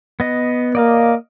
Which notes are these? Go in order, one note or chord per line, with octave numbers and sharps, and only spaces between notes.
B3 D#5
A#3 D5 D#5 F5